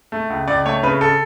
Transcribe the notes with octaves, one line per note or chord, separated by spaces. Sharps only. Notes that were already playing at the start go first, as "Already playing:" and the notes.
A3
C#2
C#2 D5
A3 C#5
C#3 B4
A4